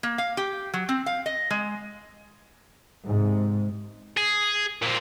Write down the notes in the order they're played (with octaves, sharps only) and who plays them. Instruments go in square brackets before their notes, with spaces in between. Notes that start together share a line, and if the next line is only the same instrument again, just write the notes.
[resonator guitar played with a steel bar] A#3
F5
G4
F#3
C4
F5
D#5
G#3
[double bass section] G#2 C3
[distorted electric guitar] G#4
A#2 C4